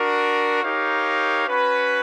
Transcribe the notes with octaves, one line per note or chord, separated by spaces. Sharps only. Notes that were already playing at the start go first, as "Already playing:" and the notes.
Already playing: D4 F#4 A#4
D#4 G4 A#4 C#5 F5
C#4 F#4 B4